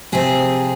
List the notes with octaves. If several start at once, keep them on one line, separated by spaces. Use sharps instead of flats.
C3 F3 C4 G#4